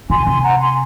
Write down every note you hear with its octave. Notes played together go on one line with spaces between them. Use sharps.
C3 G#5 C6
C3 G#5 C6
F#5 A#5
G#5 C6